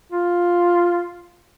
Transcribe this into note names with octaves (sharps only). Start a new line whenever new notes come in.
F4